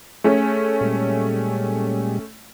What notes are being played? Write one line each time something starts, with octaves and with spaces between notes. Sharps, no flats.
A3 C#4 G#4
A#2 G3 G#3